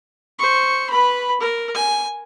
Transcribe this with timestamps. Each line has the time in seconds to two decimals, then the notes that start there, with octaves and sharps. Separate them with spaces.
0.39 C5 C#6
0.89 B4 B5
1.40 A#4
1.75 G#5